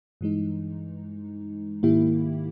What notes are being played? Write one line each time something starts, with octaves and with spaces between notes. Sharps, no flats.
G2 E3 G#3 D#4
G#2 D#3 A#3 E4 G4